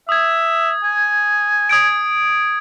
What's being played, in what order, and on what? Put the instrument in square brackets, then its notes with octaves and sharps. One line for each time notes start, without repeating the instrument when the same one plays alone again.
[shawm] E5 [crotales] D#6 G#6
[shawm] G#5
[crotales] D#6 G#6 D7